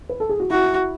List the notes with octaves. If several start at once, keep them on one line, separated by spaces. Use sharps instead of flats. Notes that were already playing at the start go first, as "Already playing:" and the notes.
B4
A4
G#4
F#4
E4 F#4